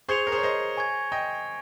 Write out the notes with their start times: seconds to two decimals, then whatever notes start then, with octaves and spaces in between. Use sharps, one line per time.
0.08 G#4 C5 C#6 G#6 C#7 F7
0.27 A#4
0.32 G#4 C5
0.38 C#5
0.43 C5 D#5
0.77 G#5 C#6 G#6
1.12 D#5 G5